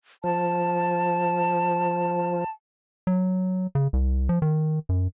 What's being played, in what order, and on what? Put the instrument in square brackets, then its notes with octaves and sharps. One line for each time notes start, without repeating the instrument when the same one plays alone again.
[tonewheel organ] F3 [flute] A5
[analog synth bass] F#3
C#3
C2
F3
D#3
F#2